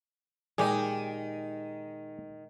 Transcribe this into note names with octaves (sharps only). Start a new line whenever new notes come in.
A#2 D#3 G#3 D#4 G4 G#4